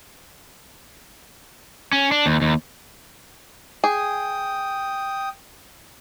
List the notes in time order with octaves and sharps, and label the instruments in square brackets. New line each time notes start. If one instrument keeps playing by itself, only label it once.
[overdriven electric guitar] C#4
D4
D#2
D#2
[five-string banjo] G#4 [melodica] G5 D#6